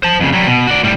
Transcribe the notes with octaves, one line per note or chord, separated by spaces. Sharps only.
C5 A5
F2 C#3
F#3 G3
B2
F#4 D5
A2 G3